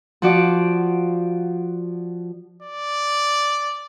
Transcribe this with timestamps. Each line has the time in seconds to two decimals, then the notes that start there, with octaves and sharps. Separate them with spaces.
0.22 F3 F#4 D5
2.62 D5